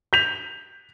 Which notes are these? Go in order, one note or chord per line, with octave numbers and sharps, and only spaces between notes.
G6 B6 F7